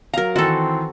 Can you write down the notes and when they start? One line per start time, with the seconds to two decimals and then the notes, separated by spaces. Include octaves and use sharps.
0.14 F#3 A#4 F5 A#5
0.36 D#3 E3 C4 F#4 A4